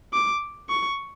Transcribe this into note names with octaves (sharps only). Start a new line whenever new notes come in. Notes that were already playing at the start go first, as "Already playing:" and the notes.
D6
C#6